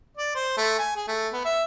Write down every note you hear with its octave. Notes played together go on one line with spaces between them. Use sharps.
D5
C5
A3
G#5
G#4
A3
B3
E5